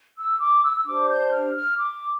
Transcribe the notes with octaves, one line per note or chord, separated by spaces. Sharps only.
E6
D6
E6
E6
D4 G4 C5 D6
G6
F6
F6
D6